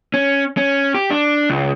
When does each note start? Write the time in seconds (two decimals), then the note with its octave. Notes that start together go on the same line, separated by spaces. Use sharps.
0.14 C#4
0.57 C#4
0.95 G4
1.11 D4
1.50 C#2